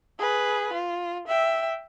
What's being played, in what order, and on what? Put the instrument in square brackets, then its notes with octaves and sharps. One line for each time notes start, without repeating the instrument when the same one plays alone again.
[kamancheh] G#4 B4
F4
E5 G5